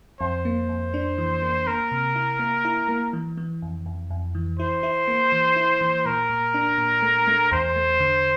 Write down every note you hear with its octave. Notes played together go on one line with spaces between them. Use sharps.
F2 C5
A#3
F2
D4
E3
A#3
A#3 A#4
C3
E4
A#3
E4
A#3
E3
E3
F2
F2
F2
E3
E4 C5
E4
A#3
E3
E4
E3
A#2 A#4
A#2
D4
A#2
A3
A3
E2 C5
A3
D3